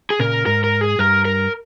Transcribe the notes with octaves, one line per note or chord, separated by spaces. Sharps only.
G#4
A#2 C#3 A#4
G#2 A#4
A#4
G#4
G2 A#4
A#4